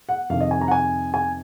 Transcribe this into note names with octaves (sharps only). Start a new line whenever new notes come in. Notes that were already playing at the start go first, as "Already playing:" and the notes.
F#5
F2 C3 D#3 F5
D#5
G#5
A#5
F#5
G#5
G#5